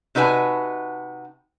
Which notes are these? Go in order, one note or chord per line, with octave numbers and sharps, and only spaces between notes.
C3 D#4 F#4 B4 G#5 A5